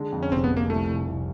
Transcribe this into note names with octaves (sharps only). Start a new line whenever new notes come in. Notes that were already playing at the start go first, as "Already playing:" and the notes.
Already playing: D3 G#3
F2
C#4
F1 C4
B3
F1
A#3
C2 A3
C2
C2